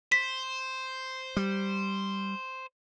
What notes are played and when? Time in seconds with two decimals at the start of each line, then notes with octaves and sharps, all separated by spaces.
0.12 C5 B6
1.37 G3